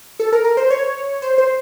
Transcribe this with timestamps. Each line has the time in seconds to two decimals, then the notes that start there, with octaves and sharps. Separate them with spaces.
0.20 A4
0.33 A#4
0.44 A#4
0.57 C5
0.70 C#5
1.22 C5
1.38 C5